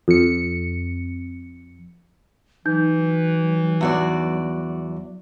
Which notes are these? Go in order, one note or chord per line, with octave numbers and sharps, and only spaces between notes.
F2 C#7
E3 F#3 D#4 G6
E2 F#4 D5